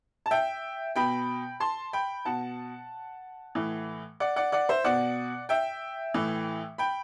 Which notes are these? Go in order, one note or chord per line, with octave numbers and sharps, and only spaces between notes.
A5
E5 G5
B2 G5 B5
A5 C6
G5 B5
B2 F#5 A5
A2 E3
D5 F#5
D5 F#5
D5 F#5
C5 E5
B2 D5 F#5
E5 G5
A2 E3
G5 B5